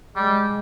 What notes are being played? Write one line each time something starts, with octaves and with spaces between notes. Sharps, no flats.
G3 G#3